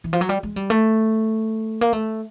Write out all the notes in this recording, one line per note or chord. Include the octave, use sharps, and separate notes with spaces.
E3
F3
F#3
G3
G#3
G3
A3
A#3
A3